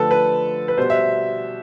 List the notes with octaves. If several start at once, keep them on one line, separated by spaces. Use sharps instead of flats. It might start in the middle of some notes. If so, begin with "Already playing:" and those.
Already playing: D3 F3 A3 A4 B4
B4
B4
B2 G3 C5
E5